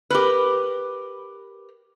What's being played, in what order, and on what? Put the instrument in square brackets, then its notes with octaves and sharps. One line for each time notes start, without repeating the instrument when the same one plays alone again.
[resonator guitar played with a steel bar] G4 A#4 B4